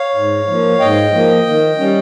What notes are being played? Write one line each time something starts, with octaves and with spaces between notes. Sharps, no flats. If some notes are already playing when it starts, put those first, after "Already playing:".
Already playing: C#5 F5
G#2
F3 A#3
G#2 D#5 G5
F3 A#3
D#3
G3 C#4